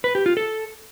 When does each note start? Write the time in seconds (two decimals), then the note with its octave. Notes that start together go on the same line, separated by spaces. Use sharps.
0.04 B4
0.15 G4
0.26 F4
0.37 A4